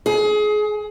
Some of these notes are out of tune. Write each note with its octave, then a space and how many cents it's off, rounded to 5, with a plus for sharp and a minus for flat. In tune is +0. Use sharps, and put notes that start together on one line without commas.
G#4 +25